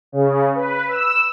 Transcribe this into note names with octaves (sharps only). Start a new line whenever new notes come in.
C#3
B4
E6